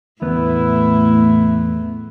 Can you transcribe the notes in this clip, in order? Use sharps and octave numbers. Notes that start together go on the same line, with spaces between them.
E2 A2 A3 B3 E4